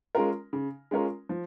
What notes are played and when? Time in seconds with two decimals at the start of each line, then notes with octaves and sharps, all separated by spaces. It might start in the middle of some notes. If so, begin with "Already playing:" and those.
0.15 G#3 C#4 F4 A#4
0.53 C#3
0.91 G#3 C#4 F4 A#4
1.29 F3